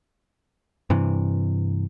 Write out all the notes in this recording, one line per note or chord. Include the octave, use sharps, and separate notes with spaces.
G2 C3 E3